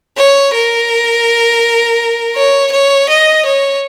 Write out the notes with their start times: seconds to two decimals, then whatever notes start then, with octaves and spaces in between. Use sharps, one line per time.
0.17 C#5
0.54 A#4
2.36 C#5
2.72 C#5
3.08 D#5
3.45 C#5